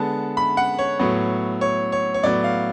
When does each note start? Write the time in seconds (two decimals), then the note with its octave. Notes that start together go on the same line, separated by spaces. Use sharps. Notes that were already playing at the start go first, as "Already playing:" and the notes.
Already playing: D3 G#3 B3 A5
0.37 B5
0.57 F#5
0.79 C#5
0.99 A2 F#3 B3
1.61 C#5
1.92 C#5
2.14 C#5
2.23 A2 F#3 B3 D5
2.44 F5